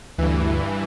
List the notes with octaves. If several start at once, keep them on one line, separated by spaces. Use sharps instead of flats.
D2 G2 E3